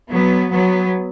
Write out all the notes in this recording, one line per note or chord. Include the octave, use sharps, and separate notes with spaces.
F#3 B3
F#3 B3